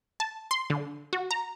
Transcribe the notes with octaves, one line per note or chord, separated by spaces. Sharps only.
A5
C6
D3
F#4
A#5